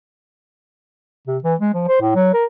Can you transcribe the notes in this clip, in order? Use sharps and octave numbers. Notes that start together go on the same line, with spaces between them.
C3
E3
G#3
F3
C5
A2
F#3
A#4